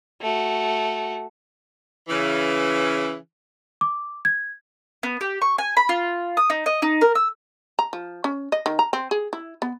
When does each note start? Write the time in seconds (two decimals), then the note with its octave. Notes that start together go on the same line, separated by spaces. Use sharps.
0.21 A3 F#4
2.09 C#3 E3
3.81 D6
4.25 G#6
5.03 B3
5.21 G4
5.42 C#6
5.58 G#5
5.77 B5
5.89 F4
6.37 D#6
6.50 D#4
6.66 D#5
6.82 D#4
7.01 A#4
7.15 E6
7.79 A#5
7.93 F3
8.24 C#4
8.52 D#5
8.66 D#3
8.79 A#5
8.93 C4
9.11 G#4
9.33 E4
9.62 B3